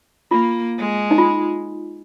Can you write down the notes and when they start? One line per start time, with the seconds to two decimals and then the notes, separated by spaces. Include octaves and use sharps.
0.31 A#3 F4
0.78 G#3
1.11 D#4
1.18 F4